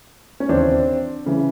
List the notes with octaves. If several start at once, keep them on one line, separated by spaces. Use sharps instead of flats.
C#4
D#2 C#3 E3 C4 D4
C#3 E3